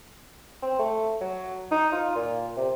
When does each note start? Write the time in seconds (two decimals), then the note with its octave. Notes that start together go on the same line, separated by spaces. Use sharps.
0.63 C4
0.79 A3
1.21 F#3
1.72 D#4
1.92 F4
2.16 A#2
2.57 C3